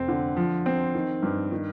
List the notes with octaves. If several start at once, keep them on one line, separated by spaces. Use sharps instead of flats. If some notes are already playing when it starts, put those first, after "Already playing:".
Already playing: F1 C4
D3
F3
C4
D#3
G2
D#3